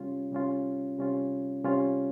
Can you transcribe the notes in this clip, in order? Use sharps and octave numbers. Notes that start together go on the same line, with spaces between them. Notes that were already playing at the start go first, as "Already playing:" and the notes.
Already playing: C3 G3 C#4 F4
C3 G3 C#4 F4
C3 G3 C#4 F4
C3 G3 C#4 F4